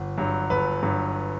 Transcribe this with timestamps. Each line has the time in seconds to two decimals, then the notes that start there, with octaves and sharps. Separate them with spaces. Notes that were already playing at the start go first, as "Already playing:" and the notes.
Already playing: G1
0.18 G2 F#3
0.50 G1 B4
0.83 G2 F#3